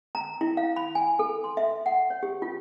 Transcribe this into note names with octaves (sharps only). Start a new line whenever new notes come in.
A#5
E4
F5
B5
G#5
A4
C6
E5
F#5
C#5
G4
F4